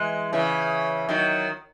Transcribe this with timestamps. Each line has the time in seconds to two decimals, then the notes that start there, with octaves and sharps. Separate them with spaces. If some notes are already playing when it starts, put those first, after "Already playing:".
Already playing: E3 G#3
0.33 C#3 E3
1.09 D#3 F#3